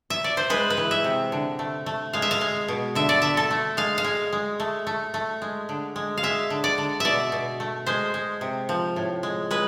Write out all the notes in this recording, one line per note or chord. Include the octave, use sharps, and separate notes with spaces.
E5
D5
C5
G#3 B4
B4
E3
E5
C3
D3
A3
A3
G#3 F5
E5
F5
G#3
B2
D3 E5
D5
D3 E5
A4
A3
G#3 F5
F5
G#3
G#3
A3
A3
A3
G#3
D3
G#3
F5
G#3 E5
D3
D5
D3
B2 D5 E5
B2
A3
G#3 C5
G#3
C3
F3
A2
G#3
G#3 B4